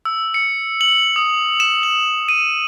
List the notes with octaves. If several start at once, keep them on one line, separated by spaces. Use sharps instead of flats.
E6
C#7
F#7
D#6
E7
F#7
D#7